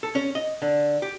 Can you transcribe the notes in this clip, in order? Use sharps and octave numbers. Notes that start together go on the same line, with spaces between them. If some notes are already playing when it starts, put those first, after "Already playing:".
A4
C#4
D#5
D3
G4